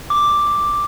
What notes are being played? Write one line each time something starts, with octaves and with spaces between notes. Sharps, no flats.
D6